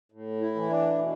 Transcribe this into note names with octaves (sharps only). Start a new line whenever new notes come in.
A2
E4
E3
D4
B2